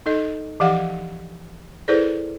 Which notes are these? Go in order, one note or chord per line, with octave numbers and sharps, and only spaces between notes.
D#4 A4 D#5
E3 F3 G4 F5 F#5
E4 G#4 A4 B4 C5 D5